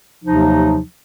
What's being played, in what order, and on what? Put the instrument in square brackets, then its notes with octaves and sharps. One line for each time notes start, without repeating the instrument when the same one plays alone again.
[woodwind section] D#2 C3 F3 F#3 D#4